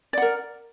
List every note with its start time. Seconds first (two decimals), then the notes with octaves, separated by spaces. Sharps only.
0.13 D5
0.18 F#5
0.22 A#4